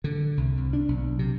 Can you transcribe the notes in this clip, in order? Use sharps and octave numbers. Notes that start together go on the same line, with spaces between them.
D3
C2
C2
D4
B1
C3